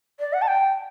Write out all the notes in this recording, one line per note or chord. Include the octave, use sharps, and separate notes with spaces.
D5
F#5
A5
G5